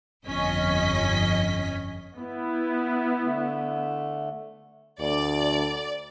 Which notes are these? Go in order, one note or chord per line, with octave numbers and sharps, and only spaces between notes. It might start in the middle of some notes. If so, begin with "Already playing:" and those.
G1 F2 C#4 D#5 B6
B3 E4
D3 A3
D2 D5